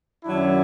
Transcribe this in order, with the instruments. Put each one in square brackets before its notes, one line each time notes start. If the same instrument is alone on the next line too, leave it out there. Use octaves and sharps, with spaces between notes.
[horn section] F#2 D#3 F#3 D4 E4